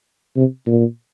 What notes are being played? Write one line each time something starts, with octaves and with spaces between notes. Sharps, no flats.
C3
A#2